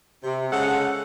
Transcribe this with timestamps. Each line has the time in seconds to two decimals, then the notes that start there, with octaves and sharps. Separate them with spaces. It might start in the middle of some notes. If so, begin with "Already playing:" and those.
0.24 C3
0.52 C#3 G#3 A4 F#5